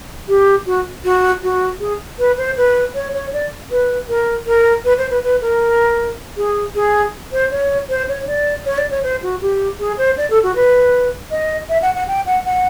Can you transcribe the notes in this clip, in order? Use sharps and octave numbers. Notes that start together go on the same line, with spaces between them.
G4
F#4
F#4
F#4
G#4
B4
C5
B4
C#5
C#5
D5
B4
A#4
A#4
B4
C5
B4
B4
A#4
G#4
G#4
C5
C#5
C5
C#5
D5
C#5
D5
C#5
C5
F#4
G4
G#4
C5
D5
A4
F#4
B4
D#5
E5
F#5
F#5
G5
F#5
F#5